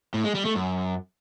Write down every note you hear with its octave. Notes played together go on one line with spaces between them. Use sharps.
A2
G#3
G3
A3
F#2